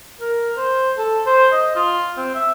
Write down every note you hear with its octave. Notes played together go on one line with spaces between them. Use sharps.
A#4
C5
A4
C5
D#5
F4
C4
E5